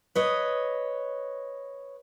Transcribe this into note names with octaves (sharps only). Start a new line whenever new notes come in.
B4 C#5 D#5